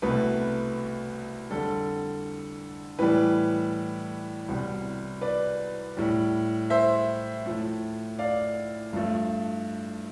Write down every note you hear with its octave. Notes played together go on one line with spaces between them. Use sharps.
C2 B2 A3 B4
F2 D3 G3 A4
A2 E3 G3 B4
C2 B2 G3
B4 D5
A2 G3
C5 E5
A2 F3 A3
D5 F5
G2 F3 A3